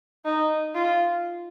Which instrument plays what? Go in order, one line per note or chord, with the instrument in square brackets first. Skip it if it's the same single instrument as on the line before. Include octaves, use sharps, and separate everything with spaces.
[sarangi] D#4
F4